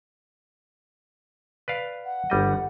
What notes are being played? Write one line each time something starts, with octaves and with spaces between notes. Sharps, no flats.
B4 D5 F5
F#5
G1 G3 D#5